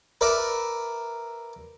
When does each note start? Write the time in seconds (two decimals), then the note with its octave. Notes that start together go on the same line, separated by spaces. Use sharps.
0.21 A#4 B4 D5 E5